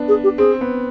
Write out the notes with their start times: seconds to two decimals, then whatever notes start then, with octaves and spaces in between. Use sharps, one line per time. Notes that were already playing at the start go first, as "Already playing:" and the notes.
Already playing: B3 D4
0.08 G#4
0.24 G4
0.38 C4 G#4
0.61 B3